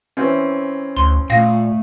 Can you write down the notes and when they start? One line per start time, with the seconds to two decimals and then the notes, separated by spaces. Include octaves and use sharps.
0.17 E3 C4 C#4
0.97 D2 C6
1.30 A#2 A3 F5 G5 A#6